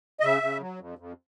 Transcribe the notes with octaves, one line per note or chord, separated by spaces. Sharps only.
D#5
C#3 E5
C#3
F#3
F2
F2